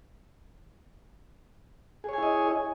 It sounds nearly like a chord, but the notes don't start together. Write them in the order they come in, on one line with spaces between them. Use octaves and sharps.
G#4 C#5 G#5 E4 D#5